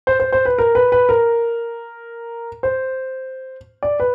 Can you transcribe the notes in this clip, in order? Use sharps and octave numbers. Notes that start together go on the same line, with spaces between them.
C5
C5
C5
B4
A#4
B4
B4
A#4
C5
D5
B4